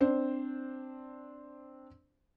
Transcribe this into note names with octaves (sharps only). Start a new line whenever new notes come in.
C4 D4 C5